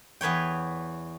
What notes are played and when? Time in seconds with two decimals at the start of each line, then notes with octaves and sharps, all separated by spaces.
0.21 E2 B4 C#5 G5